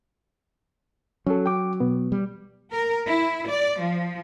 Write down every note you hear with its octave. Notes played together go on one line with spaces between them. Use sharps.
F#3 C#4 A4
G5 D6
B2 B3
G3
A#4
E4
D5
F3